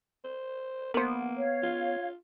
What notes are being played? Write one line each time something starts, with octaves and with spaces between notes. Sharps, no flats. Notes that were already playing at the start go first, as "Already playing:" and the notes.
C5
A#3 B3 A#4 C5
C#5 F5
F4